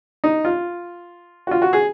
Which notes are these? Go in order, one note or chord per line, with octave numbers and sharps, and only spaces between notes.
D#4
F4
F#4
F4
F#4
G#4